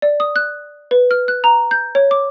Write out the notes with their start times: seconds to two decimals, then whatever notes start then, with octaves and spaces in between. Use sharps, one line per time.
0.02 D5
0.20 D#6
0.36 F#6
0.91 B4
1.11 F6
1.28 F#6
1.44 A#5
1.71 G6
1.95 C#5
2.11 D6